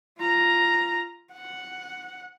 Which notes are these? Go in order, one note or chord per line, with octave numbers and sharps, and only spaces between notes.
F4 A#5
F#5